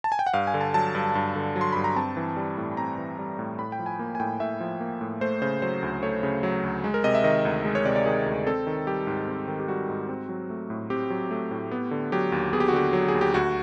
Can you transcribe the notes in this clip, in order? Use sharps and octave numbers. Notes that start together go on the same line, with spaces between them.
A5
G#5
G5
F#5
G2 F5
G#5
D3
A5
F#3 A5
G2
G2
D3
F#3
C6
G2 B5
A#5
C4 A5
E3
G3
A2
C4 A#5
E3
G3
A2
A2 B5
G5
F3
G#5
A#3
G#5
A2 G5
A2 E5
F3
A#3
A2
A3 C5
C#3 C5
F#3 C5
D2
A3 C#5
C#3
F#3
D2
G#3
A#4
C3 D#5
E5
D#3 D#5
D2
G#3
C#5
C3 D5
D5
D#3 G#4
D2
C4 A4
D#3
G3 G4
G#2
C4
D#3
G4
G3 F#4
G#2
C4
F#3
A3
A2
C4 G4
F#3
A3
A2
B3
D3
F#3 G4
D#2
B3 G#4
G4
F#4
D3 G4
F#3
G#4
D#2
G4
D2 F#4